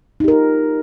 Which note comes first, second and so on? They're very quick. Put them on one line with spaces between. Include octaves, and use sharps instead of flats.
D#4 G4 A#4 F4